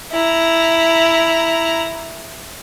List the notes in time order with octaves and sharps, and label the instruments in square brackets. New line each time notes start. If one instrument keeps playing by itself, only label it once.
[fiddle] E4 A#5